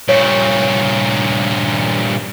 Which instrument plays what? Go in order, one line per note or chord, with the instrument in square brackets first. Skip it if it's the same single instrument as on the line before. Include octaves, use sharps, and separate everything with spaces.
[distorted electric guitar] G2 A#2 [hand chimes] C#5